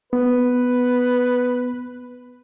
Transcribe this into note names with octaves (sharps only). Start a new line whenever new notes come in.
B3 B4